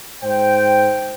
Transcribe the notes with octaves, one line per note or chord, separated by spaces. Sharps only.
G#2 C5 G5